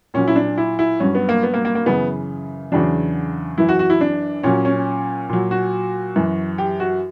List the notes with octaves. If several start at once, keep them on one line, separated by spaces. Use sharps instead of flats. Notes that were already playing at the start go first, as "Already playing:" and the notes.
A#2 F#3 C#4
E4
D4
E4
E4
G2 F#3 C#4
B3
A#3
B3
A#3
A#3
A#3
F#2 C#3 E3 B3
E2 C#3 F#3 D4
F#2 E3 E4
F#4
F#4
E4
D4
A#2 F#3 C#4
C#4
A#2 F#3
F#4
F#2 E3
G4
F#4